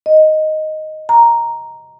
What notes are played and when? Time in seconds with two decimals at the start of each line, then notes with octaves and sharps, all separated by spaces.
0.06 D#5
1.09 A#5